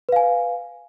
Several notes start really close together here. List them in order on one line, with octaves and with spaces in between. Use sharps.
B4 F5 G#5